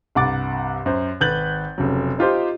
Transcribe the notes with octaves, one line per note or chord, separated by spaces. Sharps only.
C2 G2 F#5 D6 A6
F#2 C5
G#1 B4 G6 A6 F#7
F1 C#3 F#3
D#4 F4 G4 C5